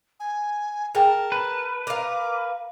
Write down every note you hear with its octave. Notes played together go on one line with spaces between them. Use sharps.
G#5
G#4 A#4 G5 A5
B4
A#4 F5 D6